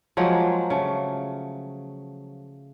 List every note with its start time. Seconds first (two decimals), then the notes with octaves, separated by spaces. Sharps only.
0.17 F3 F#3 G#3 A#3
0.70 C#3 A3